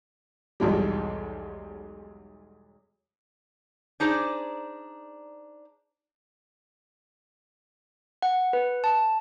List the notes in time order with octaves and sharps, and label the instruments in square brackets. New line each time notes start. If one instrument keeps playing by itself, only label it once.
[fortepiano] B1 E2 G#2 F#3 G3
[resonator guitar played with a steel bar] D4 D#4 G#4 C5 D5
[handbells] F#5
B4
A5